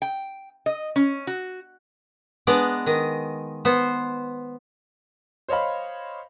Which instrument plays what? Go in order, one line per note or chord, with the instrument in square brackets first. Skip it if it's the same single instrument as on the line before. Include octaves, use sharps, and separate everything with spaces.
[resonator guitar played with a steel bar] G5
D#5
C#4
F#4
[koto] G#3 B3 D4 D5 D#5
D#3 D#5
B3 C5
[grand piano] C5 C#5 D#5 F5 B5